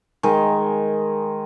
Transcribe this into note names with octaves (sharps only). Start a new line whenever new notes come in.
D#3 G#3 A#4 G#5